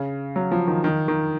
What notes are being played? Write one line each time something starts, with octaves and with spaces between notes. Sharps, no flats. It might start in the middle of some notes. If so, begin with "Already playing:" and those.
Already playing: C#3
F#3
F3
D#3
D#3
D#3